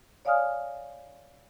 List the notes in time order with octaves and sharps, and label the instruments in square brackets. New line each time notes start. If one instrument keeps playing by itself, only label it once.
[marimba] C#5 D5 F5 G#5 D#6 F6